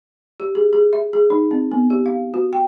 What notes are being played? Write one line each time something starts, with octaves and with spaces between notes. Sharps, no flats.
G4
G#4
G#4
E5
G#4
D#4
C4
B3
G4
F5
F#4
G5